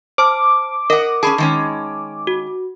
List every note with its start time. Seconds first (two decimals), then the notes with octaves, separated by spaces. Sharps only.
0.18 C5 A5 D6 F6
0.90 A#4 D#5 F#5
1.23 C#4 G#4 A5 B5
1.38 D#3 G#3 C#4
2.27 F#4